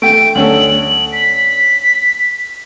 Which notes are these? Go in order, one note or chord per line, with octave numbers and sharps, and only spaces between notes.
A3 G5 D7
D2 C#4 A4 F#7
B6